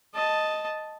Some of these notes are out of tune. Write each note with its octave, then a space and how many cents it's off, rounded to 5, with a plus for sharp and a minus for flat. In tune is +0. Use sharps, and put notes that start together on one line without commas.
D#5 +0 A5 +0